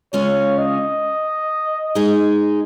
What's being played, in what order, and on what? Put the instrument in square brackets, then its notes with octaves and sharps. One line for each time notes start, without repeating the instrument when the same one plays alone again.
[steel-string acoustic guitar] C#3 G#3 C#4 F4 [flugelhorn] C#5
[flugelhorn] D#5
[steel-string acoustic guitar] G#3 D#4 G#4